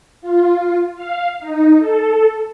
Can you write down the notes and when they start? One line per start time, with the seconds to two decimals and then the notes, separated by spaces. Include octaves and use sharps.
0.21 F4
0.96 F5
1.40 D#4
1.79 A4